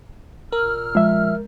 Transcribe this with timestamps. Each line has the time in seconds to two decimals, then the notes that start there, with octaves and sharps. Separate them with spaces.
0.52 A#2 A#4 E6 F6
0.95 F3 G#3 E5